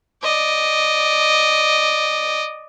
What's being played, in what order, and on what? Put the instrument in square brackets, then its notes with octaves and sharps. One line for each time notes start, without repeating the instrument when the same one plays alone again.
[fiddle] D5 D#5